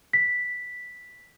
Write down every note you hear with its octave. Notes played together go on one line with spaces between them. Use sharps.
B6